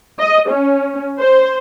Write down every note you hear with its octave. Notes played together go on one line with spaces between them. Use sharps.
D#5
C#4
C5